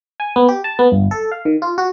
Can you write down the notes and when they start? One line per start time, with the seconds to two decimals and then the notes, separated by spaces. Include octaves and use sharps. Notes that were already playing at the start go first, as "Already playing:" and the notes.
0.20 G#5
0.36 B3
0.48 G4
0.64 A5
0.79 B3
0.91 G1
1.11 A4
1.32 F5
1.45 D#3
1.62 F4
1.78 F#4